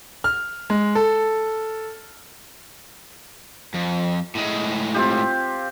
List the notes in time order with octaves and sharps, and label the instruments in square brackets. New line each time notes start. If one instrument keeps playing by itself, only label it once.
[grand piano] F6
G#3
A4
[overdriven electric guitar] F2
A2 G#3
[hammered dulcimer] C4 F4 G4